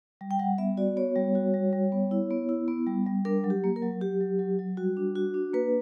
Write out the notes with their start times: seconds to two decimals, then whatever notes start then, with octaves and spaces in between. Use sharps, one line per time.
0.21 G3
0.31 G5
0.39 G3 F#5
0.58 B3 E5
0.77 F#4 D5
0.97 B3 C#5
1.16 G3
1.35 F#4
1.54 G3
1.73 G3
1.92 B3
2.11 E4
2.31 B3
2.49 E4
2.68 B3
2.87 G3
3.06 G3
3.25 D4 A#4
3.44 F#3
3.50 G4
3.64 A#3
3.76 A#4
3.82 F#3
4.01 F#3 G4
4.21 F#3
4.39 F#3
4.59 F#3
4.77 G3 F#4
4.97 D4
5.16 F#4
5.34 D4
5.53 A#3 B4